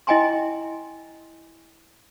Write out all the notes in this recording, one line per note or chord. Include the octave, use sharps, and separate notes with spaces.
E4 D#5 G5 G#5 A#5 C6